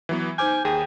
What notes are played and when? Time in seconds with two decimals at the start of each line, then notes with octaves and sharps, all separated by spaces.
0.09 E3 F#3 B3
0.38 D#4 C5 G#5 D6 F6 G6
0.65 D#2 G#4 G5